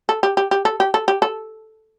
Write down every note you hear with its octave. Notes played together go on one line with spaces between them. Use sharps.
A4
G4
G4
G4
A4
G4
A4
G4
A4